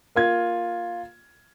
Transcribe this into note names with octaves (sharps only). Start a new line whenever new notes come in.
A#3 F4 G#6